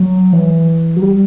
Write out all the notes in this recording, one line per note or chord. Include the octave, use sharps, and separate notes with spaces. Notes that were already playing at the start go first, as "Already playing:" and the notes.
Already playing: F#3
E3
F#3
G3